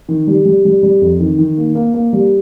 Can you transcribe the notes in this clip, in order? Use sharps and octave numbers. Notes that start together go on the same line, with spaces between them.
D#3
G3
G3
G3
G3
F2
D#3
D#3
A#3
A#3
A#3
G3